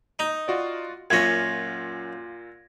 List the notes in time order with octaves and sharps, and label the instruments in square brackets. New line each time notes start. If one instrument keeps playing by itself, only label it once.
[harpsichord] D#4
[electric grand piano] F4 F#4 D5
[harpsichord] F#2 C#4 [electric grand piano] A#2 F4 F#5 [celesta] G#6 A#6